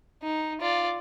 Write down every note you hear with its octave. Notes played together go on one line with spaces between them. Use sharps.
D#4
F4 D5